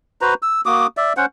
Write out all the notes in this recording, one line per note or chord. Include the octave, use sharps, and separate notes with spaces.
F#4 B4 C5 A#5
E6
A#3 F#4 D6 D#6
D5 E5
C#4 C5 F#5